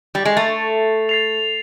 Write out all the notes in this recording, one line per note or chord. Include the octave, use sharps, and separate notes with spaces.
G3
G#3
A3 A6 C7 F7
A6 C7 F7